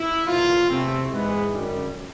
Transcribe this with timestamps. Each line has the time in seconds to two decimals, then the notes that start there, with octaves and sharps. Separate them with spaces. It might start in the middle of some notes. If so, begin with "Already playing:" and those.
Already playing: E4
0.27 E2 B2 F#3 A#3 F4
0.69 E2 C3 E3 A3 C4
1.12 G#2 E3 G#3 B3
1.54 F#2 D3 G3